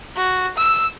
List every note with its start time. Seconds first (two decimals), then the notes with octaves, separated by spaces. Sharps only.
0.17 F#4
0.57 E6